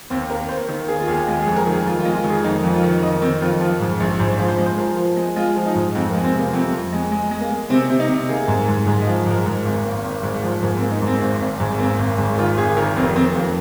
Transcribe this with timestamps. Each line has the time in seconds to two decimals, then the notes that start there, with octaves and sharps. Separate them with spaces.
0.10 D#2 C4
0.30 A#3 A#4
0.49 A#3 C5
0.69 D#3
0.88 A#3 G#4
1.00 F4
1.08 D#2 G#4
1.27 G#3 F4
1.42 G#4
1.47 F2
1.56 A#4
1.66 D#3 G#4
1.86 F2 F4
2.00 F4
2.05 G#3
2.15 F4
2.24 D#3 G#4
2.44 F2 D#4
2.64 F2
2.74 F4
2.83 D#3
3.02 D#3 D#5
3.22 D#3 C4
3.41 F2 F4
3.60 F3 F4
3.80 G#2
4.00 A#1
4.19 G#2 C5
4.40 F3
4.48 C5
4.58 G#3
4.66 C5
4.78 F3 A#4
4.97 F3
5.17 G#3
5.36 G#3 F4
5.56 F3
5.66 D#4
5.75 G#2
5.95 F2 C4
6.10 A#3
6.14 G#3
6.24 C4
6.34 C3
6.39 A#3
6.53 F2 C4
6.73 F2
6.93 G#3
7.12 G#3
7.31 G#3
7.41 A#3
7.51 G#3
7.70 C3 C4
7.90 C3
7.99 D#4
8.09 C3
8.29 A#3 G#4
8.48 G#2
8.68 G#2
8.87 G#2 A#4
9.02 D#5
9.07 F3
9.26 G#2 A#4
9.46 G#2
9.66 G#1
9.85 A#3
10.04 G#1
10.23 G#2
10.43 F3
10.63 G#2 A#3
10.77 C4
10.82 A#3
10.91 D#4
11.02 G#2 C4
11.21 G#1
11.41 G#1
11.60 G#2
11.79 A#3 C4
11.99 G#1
12.18 G#2
12.38 D#3 F4
12.57 G#1 G#4
12.77 D#3 A#4
12.96 F1 C4
13.16 F1 C4
13.35 F2 A#3